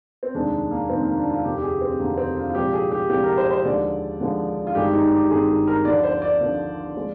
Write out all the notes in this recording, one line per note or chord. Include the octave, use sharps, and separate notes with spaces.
C4
F1 D#2 D#3 G#3 D4
A#3
F1 D#2 D#3 G#3 C4
A#3
D4
F4
F1 D#2 D3 G4
G4
G#4
C4
F1 D#2 D3 A#3
C4
F4
F4
C2 A#2 F3 G#3 G4
G#4
G4
C2 A#2 F3 G#3 G4
A#4
C5
C5
D#2 D3 F3 G#3 D5
D#2 D3 F3 G#3
F4
G#1 G2 D#3 G#3 G4
D#4
G4
G#1 G2 D#3 G#3 G#4
G#4
A#4
D#2 D3 F3 D5
C5
D5
D#2 D3 F3
F3 G#3